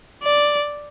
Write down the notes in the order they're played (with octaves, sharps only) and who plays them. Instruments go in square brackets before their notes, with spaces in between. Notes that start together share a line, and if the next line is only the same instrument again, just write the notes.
[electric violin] D5